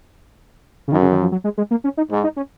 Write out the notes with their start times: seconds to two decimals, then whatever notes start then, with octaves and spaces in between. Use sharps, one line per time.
0.88 C#3
0.92 F#2 D#3
1.02 C#3
1.12 D#3
1.21 F3
1.32 F#3
1.44 G#3
1.58 G#3
1.71 A#3
1.84 C#4
1.97 D#4
2.10 G#2
2.24 D#4
2.36 C#4